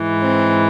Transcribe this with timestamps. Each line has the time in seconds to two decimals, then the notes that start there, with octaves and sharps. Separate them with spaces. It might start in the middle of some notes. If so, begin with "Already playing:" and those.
Already playing: G#2 E3
0.23 C4